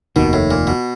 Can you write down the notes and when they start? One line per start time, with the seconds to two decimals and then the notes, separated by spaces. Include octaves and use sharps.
0.16 F1 D#2 B2 D#3
0.33 A2
0.51 A#2
0.67 B2